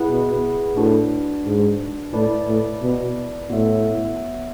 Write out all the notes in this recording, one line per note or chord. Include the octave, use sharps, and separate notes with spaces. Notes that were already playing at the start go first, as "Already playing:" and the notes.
Already playing: E4 G#4 B4 F#5
B2
A2 D4 F#4 B4
G#2
A2 E4 B4 D5 A5
A2
B2
A2 B3 F#4 C#5 E5